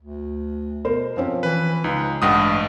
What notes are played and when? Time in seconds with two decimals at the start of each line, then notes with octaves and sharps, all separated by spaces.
0.01 D2
0.85 B2 A#4 C5
1.17 F3 C4 C#4
1.43 E3 B4
1.84 C#2 D#4
2.22 A1 G2 G#3 F#5 G5 D#6